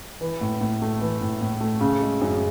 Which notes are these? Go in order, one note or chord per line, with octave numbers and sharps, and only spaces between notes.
E3
A2
A2
A3
E3
A2
A2
A3
C#3
G#3
F#2